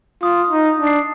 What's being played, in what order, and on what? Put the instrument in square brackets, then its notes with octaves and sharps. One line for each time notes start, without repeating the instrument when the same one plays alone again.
[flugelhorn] F4 [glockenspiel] D#6
[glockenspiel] D#6
[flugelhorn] D#4
[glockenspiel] D#6
[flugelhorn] D4
[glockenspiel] C7